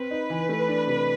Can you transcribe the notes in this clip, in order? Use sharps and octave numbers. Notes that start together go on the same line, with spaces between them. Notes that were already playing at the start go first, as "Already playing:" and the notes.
Already playing: C4 B4
D#4
E3
A3
D4
C3